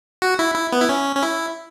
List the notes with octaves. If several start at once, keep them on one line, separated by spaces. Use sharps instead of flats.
F#4
E4
E4
B3
E4
C#4
C#4
E4